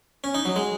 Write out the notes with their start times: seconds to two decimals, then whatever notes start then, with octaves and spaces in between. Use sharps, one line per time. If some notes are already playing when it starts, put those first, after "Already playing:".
0.24 C#4
0.35 D#4
0.45 F#3
0.56 G#3